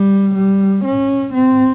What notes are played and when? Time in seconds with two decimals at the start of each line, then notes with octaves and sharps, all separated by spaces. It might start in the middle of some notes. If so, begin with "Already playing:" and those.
Already playing: G3
0.35 G3
0.84 C#4
1.34 C4